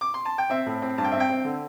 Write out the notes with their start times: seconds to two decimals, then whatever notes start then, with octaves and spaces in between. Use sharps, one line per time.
0.01 D6
0.14 C6
0.25 A5
0.38 G5
0.50 C4 E5
0.66 A2
0.82 C4
0.98 G2 A5
1.04 G5
1.12 C4 E5
1.20 G5
1.30 C4
1.45 D3